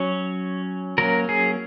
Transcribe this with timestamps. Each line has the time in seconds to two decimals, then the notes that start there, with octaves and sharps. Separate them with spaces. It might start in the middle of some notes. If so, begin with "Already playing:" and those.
Already playing: F#3 C#4 C#5
0.98 F#3 A#3 C#4 A#4
1.29 G#4